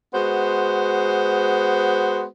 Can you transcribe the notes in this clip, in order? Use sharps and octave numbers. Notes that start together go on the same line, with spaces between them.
G#3 B3 F#4 C5